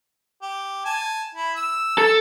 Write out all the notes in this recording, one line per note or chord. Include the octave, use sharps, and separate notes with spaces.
G4
G#5 A5
E4
E6
A4